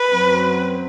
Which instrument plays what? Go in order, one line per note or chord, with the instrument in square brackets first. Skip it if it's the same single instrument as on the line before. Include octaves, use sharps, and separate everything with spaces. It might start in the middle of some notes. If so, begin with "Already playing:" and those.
Already playing: [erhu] B4
[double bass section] F#2 F#3 C4